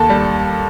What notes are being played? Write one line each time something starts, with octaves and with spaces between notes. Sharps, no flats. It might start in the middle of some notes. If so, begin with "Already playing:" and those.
Already playing: D#2 A4 A5
G3